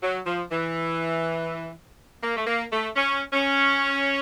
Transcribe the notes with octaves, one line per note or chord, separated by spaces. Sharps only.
F#3
F3
E3
A#3
A3
A#3
A3
C#4
C#4